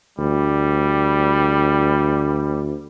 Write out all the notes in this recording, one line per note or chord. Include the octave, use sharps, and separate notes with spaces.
D2 G3